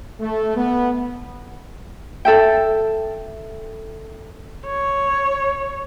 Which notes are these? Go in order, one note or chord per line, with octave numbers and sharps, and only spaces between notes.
A3
B3
A4 E5 G5
C#5